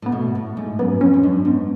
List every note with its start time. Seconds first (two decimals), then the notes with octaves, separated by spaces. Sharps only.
0.02 A2 B3
0.12 B2 A3
0.35 A2
0.57 G#2
0.79 F#2 B3
1.01 F2 C#4
1.14 G#2
1.23 F#2 D4
1.45 G#2 B3